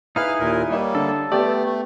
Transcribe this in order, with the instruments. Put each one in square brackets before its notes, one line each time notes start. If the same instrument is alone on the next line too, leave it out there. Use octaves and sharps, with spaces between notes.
[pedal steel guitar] D#4 E4 G#4 [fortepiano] B4 [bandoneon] F5 F6
[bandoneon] D#2 A#2 A#4
[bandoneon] G3 A#3 [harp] C#5 D#5 E5
[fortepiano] D3 [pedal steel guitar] A4
[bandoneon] A3 [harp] B3 G4 [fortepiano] D5
[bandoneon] A3